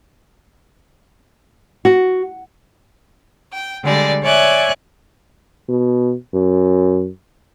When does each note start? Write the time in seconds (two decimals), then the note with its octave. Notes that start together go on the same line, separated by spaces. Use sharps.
1.85 F#4
3.52 G5
3.83 D3 G3 G#3 D5
4.22 C#5 D5 E5 G#5 F#6 G#6
5.69 B2
6.34 F#2